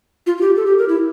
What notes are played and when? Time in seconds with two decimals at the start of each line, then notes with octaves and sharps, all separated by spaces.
0.27 F4
0.38 F4
0.41 G4
0.56 A4
0.66 G4
0.78 A#4
0.89 E4